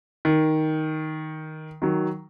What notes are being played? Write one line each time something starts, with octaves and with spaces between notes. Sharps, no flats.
D#3
D#3 F#3